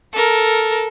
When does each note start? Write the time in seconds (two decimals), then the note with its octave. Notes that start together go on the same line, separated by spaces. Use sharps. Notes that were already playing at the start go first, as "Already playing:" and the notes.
0.13 A4 A#4